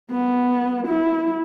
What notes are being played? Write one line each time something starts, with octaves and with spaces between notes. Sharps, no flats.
B3
E4